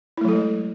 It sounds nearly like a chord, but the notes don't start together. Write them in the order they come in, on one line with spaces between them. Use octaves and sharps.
E4 A3 F#3 A4 G#3